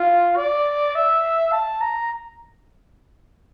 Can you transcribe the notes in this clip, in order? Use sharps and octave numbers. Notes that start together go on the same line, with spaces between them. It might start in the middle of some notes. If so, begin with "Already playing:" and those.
Already playing: F4
D5
E5
A5
A#5